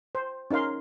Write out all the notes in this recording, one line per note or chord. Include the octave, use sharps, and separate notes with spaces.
C5
C#4 D#4 A#4 F5 C6